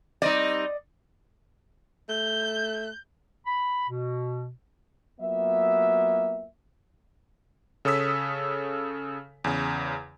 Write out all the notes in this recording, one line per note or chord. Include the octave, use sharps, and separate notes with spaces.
G3 C4 D#4 D5 D#5
A3 G6
B5
B2
F#3 A#3 B3 F4 E5
C#3 A4 C#5 D#6 E6 B6
E2 C#3